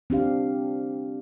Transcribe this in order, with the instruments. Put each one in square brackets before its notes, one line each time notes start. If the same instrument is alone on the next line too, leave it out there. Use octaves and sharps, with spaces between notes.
[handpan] C4 D4 G4 F5